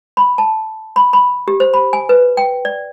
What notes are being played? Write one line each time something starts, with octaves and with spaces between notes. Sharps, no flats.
B5
A5
B5
B5
G4
C5
B5
G#5
B4
G5
D5